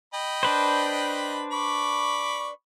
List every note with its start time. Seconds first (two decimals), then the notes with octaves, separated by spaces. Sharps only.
0.14 D#5 G5 B5
0.43 D4 B4 C5
1.52 B5 C#6 D6